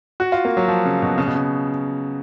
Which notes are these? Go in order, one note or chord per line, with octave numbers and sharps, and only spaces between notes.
F#4
F4
A#3
F#3
F3
C#3
B2
C#3
B2
C#3